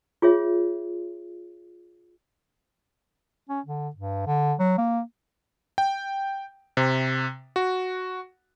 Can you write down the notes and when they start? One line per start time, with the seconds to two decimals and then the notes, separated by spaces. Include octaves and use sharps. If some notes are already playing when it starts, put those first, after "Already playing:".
0.22 F4 G#4 C#5 E5
3.49 C#4
3.66 D3
3.96 G2
4.27 D3
4.59 F#3
4.78 A#3
5.78 G5
6.77 C3
7.56 F#4